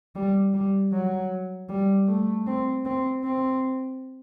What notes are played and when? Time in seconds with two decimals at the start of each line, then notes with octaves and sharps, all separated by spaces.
0.15 G3
0.53 G3
0.92 F#3
1.69 G3
2.08 A3
2.47 C4
2.85 C4
3.24 C4